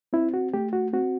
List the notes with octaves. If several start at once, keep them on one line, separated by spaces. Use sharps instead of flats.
C4 E4
F#4
A3 G4
F#4
C4 F#4